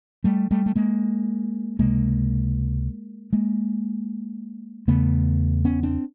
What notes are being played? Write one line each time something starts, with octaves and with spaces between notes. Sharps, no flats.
G3 A3
G3 A3
A3
G#3 A#3
C#2 C3 G#3 A#3
G#3 A#3
E2 C#3 A3 B3
B3 C#4
C4 D4